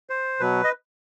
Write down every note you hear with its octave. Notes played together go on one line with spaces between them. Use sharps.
C5
B2 F#3 B4
D#5